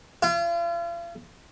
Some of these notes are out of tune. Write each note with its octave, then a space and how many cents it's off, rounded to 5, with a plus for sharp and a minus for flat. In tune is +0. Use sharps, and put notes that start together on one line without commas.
F4 -40